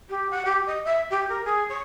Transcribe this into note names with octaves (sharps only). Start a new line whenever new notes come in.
G4
F#5
G4
D#5
E5
G4
A#4
G#4
C#5